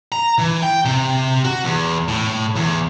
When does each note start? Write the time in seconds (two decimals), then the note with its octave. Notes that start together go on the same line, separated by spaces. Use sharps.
0.12 A#5
0.38 E3
0.62 G5
0.85 C3
1.45 F#4
1.65 E2
2.08 A2
2.56 E2